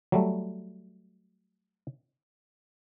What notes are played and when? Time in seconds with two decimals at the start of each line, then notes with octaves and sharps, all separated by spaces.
0.12 F#3 G3 A3